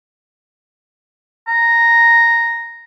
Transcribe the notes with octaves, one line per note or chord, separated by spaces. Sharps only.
A#5